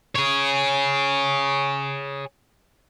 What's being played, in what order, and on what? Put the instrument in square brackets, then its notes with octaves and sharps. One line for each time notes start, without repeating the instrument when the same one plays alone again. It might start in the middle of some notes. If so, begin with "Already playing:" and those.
[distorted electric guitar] G#4 C#5